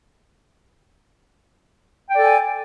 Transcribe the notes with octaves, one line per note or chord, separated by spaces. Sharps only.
A4 D5 G5 G#5